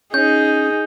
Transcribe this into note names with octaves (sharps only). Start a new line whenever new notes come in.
C#4 D#4 G#4 G6